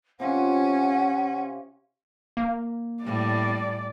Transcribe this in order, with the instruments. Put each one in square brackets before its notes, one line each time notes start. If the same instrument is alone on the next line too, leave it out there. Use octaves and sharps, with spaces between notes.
[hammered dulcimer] C3 F4 G4 [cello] C#4 [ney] F#5
[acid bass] A#3
[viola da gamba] A2 G3 [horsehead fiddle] D5